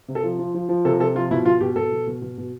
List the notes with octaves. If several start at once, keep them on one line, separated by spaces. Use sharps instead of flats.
C3
A4
F3
F3
F3
F3
C3 A4
C3 A4
F3 F4
B2 E4
B2 F4
B2 G4
B2 A4
B2
B2
B2
B2